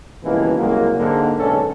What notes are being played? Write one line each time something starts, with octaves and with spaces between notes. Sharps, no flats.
C#2 G2 B2 D#3 E3 A#3
C2 C#3 F#3 G#3 A#3
G#2 D3 A#3
B1 D3 G#3 C#4 A4